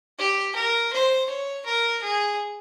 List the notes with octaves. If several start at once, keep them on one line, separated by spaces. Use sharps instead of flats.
G4
A#4
C5
C#5
A#4
G#4